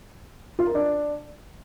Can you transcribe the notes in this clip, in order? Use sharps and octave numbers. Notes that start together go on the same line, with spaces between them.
F4
A#4
D4